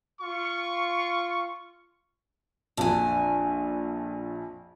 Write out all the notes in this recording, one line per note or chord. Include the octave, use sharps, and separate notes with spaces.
F4 C#6
A#1 F2 D4 G#5